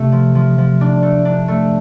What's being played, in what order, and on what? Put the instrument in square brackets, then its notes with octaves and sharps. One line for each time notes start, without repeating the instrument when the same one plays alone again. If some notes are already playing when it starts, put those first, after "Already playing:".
Already playing: [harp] C3 A3
F3
F3
F3
D4
A3
D4
A3